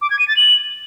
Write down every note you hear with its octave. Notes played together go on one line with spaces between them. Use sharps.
D6
G#6
D#7
A6
F#7